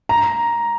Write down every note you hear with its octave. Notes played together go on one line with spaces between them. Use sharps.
A#5